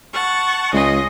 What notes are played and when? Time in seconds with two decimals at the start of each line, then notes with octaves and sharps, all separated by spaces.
0.12 F#5 A5 C#6
0.73 C#2 D#5 G#5 C6